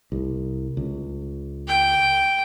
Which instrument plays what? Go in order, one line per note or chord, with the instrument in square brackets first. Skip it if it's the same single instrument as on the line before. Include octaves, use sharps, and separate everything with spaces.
[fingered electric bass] C2
C#2
[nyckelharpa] G5